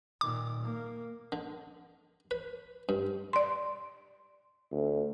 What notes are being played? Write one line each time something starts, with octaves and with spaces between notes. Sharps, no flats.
A#2 D#3 D6
A#3
D3
B4
G2
D5 C6
D2